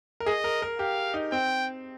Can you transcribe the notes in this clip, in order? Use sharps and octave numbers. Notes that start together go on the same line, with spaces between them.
A#4
G#4 D#5
A#4
A#4
G4 F5
D#4
C4 G5